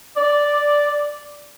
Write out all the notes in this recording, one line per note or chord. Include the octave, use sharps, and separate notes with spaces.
D5